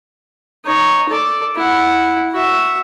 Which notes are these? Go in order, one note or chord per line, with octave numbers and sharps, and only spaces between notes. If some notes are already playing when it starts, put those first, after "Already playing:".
D#4 C#5
A4 D5
E4 F#5
F#4 E5